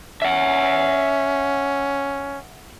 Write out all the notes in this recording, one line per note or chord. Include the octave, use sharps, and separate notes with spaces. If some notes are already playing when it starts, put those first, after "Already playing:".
C#4 E5 F#5